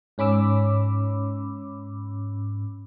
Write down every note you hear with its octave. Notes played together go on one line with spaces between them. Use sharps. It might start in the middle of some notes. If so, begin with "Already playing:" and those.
G#2 C#4 B5 D6 E6